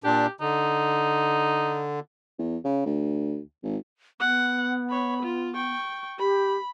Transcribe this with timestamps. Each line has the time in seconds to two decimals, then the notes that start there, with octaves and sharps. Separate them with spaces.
0.04 A#2 D4 G4
0.41 D3 D#4
2.38 E2
2.64 C#3
2.86 D2
3.63 G#1
4.20 B3 F#5
4.90 C#5 B5
5.22 F4
5.54 G5 C#6
6.19 G4 B5